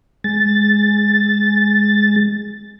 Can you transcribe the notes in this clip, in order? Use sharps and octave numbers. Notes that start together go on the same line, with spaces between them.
G#3 A6